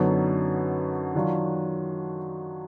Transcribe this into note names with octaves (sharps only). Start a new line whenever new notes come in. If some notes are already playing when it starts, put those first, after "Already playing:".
Already playing: F#2 D3 F#3 B3 D#4
D#3 F#3 D4 F4